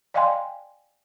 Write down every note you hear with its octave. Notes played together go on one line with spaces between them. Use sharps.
D5 D#5 F5 G5 G#5 C6